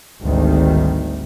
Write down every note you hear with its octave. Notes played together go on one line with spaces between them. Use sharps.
G#1 D2 D#3 G3